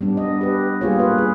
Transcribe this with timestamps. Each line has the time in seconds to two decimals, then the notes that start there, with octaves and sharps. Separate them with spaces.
0.01 G3 B3 D4
0.17 D#5
0.41 G4 B4
0.81 G3 A#3 F4 G#4 C#5
0.99 A#3 B4
1.18 G#4